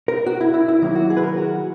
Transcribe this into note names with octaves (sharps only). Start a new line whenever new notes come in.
A#4
F#4
E4
E4
E4
D#3 F#3 A#3 E4
F#4
G#4
B4
A#4
F#4